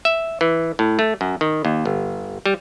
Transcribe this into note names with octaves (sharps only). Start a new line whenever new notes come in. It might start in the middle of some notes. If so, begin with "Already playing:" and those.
E5
E3
A2
A3
F#2
D#3
D#2
G1
G3